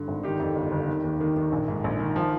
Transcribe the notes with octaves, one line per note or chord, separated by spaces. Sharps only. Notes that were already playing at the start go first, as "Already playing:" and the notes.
Already playing: G2 D3
G#1
D#3 D#4 G4
F2
G1
G1
D#3
D#2
D#3
D#3
A#1
G#2
A#1
D#3
F3